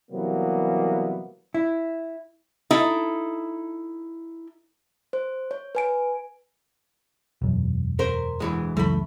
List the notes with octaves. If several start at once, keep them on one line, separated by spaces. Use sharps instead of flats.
C3 E3 F#3 G3 A#3 B3
E4
D#4 E4 A4
C5
C#5
B4 G#5 D7
E1 F#2
A#4 C5
D2 E3 G#3
C#2 F#2 E3 A3 B5